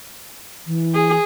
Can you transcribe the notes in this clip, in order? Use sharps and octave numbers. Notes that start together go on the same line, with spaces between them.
E3
G#4